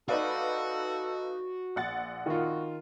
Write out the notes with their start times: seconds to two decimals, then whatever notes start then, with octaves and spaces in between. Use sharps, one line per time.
0.08 D#4 F#4 A4 B4 D5 F5
1.76 A#1 F#5 A6
2.26 D#3 F4 F#4